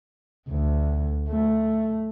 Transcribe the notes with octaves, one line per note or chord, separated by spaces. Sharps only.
D2
A3